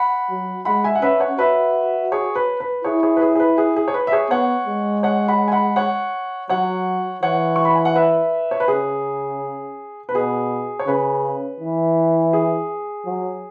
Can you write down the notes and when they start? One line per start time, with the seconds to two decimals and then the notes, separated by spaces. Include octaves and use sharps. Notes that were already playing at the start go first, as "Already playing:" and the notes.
Already playing: F#5 B5
0.30 F#3
0.65 G#3 F#5 B5
0.84 E5 G#5
0.95 F#5
1.02 C#4 B4 E5
1.20 C#5 F#5
1.39 F#4 B4 E5
2.12 G#4 C#5
2.36 B4
2.60 B4
2.85 E4 G#4 C#5
3.03 G#4 C#5
3.16 B4
3.22 G#4
3.35 G#4
3.40 B4
3.58 G#4
3.76 G#4
3.88 C#5
3.94 B4
4.07 E5
4.12 G#4 C#5
4.30 B3 C#5 F#5
4.67 G#3
5.03 C#5 F#5
5.28 F#5 B5
5.48 G#5
5.52 F#5 B5
5.76 C#5 F#5
6.49 F#3 C#5 F#5
7.23 E3 C#5 F#5
7.56 C#6
7.65 B5
7.75 G#5
7.85 F#5
7.95 B4 E5
8.51 C#5
8.60 B4
8.68 C#3 G#4
10.09 B4
10.14 B2 G#4
10.79 C#5
10.87 C#3 B4
11.60 E3
12.33 G#4
13.06 F#3